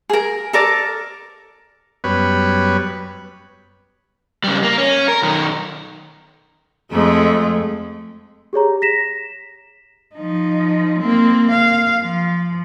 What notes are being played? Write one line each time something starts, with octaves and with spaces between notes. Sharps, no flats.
G#4 A#4
A4 A#4 D5
F#2 G3 B3 B4 C#5
C#3 G3
A#3
C#4
A#4
B1 D#3
F2 G#3 A3
G4 G#4 C#5 A#5
A#6 B6 E7
F3 D#4
A#3 C4
F5
F3